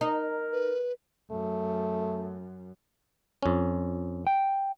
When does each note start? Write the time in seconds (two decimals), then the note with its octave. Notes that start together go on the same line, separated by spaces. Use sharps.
0.01 D#4 A#4
0.52 B4
1.31 F#2 A3
3.43 F2 C#4
4.27 G5